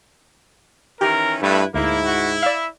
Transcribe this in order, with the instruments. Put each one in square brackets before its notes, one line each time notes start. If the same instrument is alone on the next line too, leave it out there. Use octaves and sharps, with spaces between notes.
[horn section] D#3 E3 C#4 [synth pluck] G4 [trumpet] A#4
[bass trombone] G2 [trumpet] A3 [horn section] E4 B4
[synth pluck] D2 [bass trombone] G#2 [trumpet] A#3 [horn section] E4
[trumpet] F#4
[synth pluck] D5 F5 [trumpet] E5